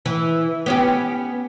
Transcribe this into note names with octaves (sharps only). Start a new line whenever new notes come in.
E3
B3 C#4 G4